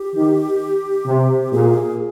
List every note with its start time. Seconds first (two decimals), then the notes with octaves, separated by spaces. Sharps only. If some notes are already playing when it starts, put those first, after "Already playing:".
Already playing: G4
0.15 D#3
1.06 C3
1.52 A#2 G#4